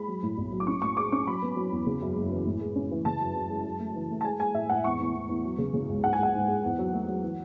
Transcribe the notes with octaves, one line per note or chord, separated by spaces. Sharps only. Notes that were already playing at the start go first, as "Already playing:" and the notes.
Already playing: G#3 B5
F#3
A2
B1
F#3
D6
C#4 C#6
A2 C#6
G#3 D6
C#4 C#6
F#3 B5
B3
F#3
E2
C#3
F#2
F#1
E3
A2
G#3
C#4
E3
C#3 A5
F#2
F#2
G#3
F#2
A3
E3
A3
A5
G#3 G#5
G#3 G#5
A2 E5
A2 F#5
E2 C#6
E2
E2
E2
F#3
C#3
C#3
C#2
G#2 F#5
G#5
G#3 F#5
G#2
G#3
E2
F#3
A3
F#3
E3